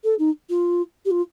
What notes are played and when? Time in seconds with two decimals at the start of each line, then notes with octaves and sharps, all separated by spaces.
0.04 A4
0.19 D#4
0.49 F4
1.05 G4
1.10 F4